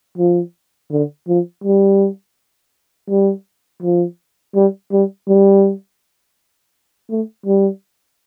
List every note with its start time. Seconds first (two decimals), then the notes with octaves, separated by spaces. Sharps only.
0.18 F3
0.92 D3
1.28 F3
1.64 G3
3.10 G3
3.82 F3
4.56 G3
4.92 G3
5.28 G3
7.10 A3
7.46 G3